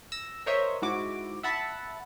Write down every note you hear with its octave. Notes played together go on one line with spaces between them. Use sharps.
E6 A#6
A#4 C5 C#5 D#5 E5
G#2 E4 F#4 D6
E5 F#5 A5 B5